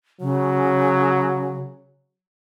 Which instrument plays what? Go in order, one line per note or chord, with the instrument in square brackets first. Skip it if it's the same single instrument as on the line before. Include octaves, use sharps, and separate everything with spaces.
[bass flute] C#3 [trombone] F#3